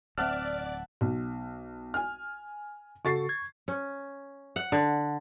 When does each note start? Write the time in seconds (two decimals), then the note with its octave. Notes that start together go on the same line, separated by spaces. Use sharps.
0.18 D1 C4 D5 E5 F#5 A5 F6
1.01 B1
1.94 G#5 F6
3.05 C#3 F#4 A4 C#6 A6 C7
3.29 G#6
3.68 C#4
4.56 F#5
4.72 D3